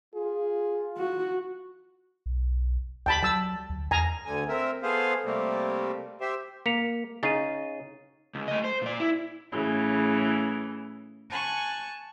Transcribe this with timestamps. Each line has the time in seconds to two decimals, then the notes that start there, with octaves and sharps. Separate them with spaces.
0.15 F4 G#4
0.97 F#4
2.26 B1
3.06 D2 G5 A5 B5
3.23 F#3 A5 E6
3.70 D2
3.91 E2 G#5 A#5
4.26 D2 D3 G#5
4.48 C4 A#4 E5
4.83 A3 B3 G#4 C5 F5
5.25 C3 G3 A3 A#3 C4
6.21 G4 C5 E5
6.66 A#3 B6 C#7 F7
7.23 C#3 C#4 D#4 A6 C7 D#7
8.35 C#2
8.48 A3 D#5
8.64 C5
8.82 A#2 D5
9.00 E4
9.52 A2 C#3 E3
11.30 G#5 A5 C#6 F#6